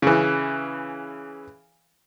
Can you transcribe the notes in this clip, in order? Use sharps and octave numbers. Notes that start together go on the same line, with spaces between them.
C#3 E3